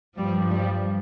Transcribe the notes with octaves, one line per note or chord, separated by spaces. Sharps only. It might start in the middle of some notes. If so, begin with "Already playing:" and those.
G2 F3 G3
G3